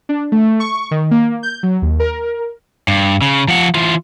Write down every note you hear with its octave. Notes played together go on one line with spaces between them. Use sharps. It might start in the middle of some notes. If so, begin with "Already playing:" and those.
D4
A3
C#6
D#3
A#3
G6
F#3
D#2
A#4
G2
C#3
F3 F#5
E3 F4